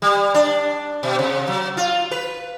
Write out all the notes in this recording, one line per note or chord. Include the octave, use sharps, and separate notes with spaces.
G3
D4
B2
C3
F#3
F4
B4